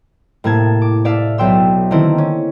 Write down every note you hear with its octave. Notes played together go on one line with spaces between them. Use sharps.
A2 C3 A#3 E4 A5 G#6
D6
E4 D5 E5 F5 A5
B1 E5 G5 C6 E6
D3 D#3 A#3 C4 E4
C#4